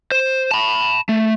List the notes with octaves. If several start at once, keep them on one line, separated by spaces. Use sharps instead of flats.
C5
A5 B5
A3